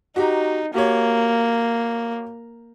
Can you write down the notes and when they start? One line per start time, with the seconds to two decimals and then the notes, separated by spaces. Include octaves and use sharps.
0.16 D#4 F#4 G4 A#5
0.74 A#3 F#4 G4 C#5